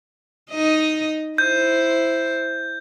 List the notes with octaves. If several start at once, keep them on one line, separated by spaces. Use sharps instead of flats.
D#4 D#5
E4 C5 G6